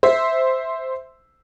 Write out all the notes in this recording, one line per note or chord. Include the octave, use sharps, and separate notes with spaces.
C5 E5